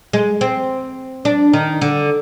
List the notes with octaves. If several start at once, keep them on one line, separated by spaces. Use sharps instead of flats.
G#3
C4
D4
D#3
D3